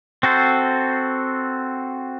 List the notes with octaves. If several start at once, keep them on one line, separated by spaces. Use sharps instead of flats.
C4 F#4 A4 C5